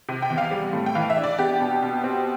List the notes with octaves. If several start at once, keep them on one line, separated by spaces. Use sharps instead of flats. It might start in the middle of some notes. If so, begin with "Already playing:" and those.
C3
G5
E2
F5
G3
A2
G5
E3 F5
E5
D4
D5
B3 G4
B2
B2
C4